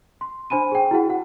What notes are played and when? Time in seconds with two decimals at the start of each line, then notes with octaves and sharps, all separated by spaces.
0.21 C6
0.50 D4 C5 G#5 B5 D#7
0.72 G#4 G5
0.91 E4 F#4 G#4 F#5
1.10 F#5